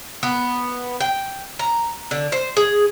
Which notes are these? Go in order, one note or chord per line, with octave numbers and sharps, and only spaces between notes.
B3
G5
A#5
D3
C5
G#4